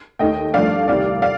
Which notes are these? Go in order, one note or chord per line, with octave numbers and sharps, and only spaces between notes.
D#2 D#3 A3 D#5 G5
G2 F3 A3 D5 F5
C2 C3 D#3 D5 F5
D5 F5